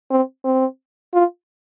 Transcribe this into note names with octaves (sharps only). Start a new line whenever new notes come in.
C4
C4
F4